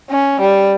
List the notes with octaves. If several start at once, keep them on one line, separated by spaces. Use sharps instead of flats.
C#4
G3